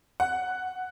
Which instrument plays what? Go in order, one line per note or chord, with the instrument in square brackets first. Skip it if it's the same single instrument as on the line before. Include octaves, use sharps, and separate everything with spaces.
[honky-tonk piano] F#5